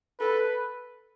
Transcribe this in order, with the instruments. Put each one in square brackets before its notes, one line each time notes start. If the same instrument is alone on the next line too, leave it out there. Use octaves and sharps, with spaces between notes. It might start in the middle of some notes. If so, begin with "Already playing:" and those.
[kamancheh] A4 [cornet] B4